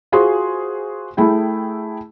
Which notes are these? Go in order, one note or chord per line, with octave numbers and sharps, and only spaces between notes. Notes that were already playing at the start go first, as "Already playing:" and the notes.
F4 F#4 G#4 C5 G#5 C6
A3 E4 G#4 G5